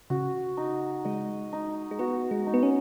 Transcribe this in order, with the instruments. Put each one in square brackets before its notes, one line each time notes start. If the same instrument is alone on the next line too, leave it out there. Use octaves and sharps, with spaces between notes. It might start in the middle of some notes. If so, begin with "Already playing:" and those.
[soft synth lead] C#3 [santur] F#4
[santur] D#4
[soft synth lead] G#3 [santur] D#5
[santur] D#4
[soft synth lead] G#3
[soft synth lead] B3 [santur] F#4
[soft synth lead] G#3
[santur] D#4
[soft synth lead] B3
C#4